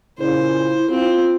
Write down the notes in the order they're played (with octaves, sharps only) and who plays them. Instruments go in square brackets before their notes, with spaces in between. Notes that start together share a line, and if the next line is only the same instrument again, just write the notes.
[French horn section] A#2 C#3 [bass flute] E4 [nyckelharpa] C5
[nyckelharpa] C4 [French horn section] F4